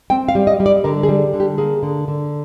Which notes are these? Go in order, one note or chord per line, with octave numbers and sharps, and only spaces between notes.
C4 G5
F5
G3
D#5
G3
D5
D3 A#4
G#4
G3
D3
G4
A#3 G#4
D3
D3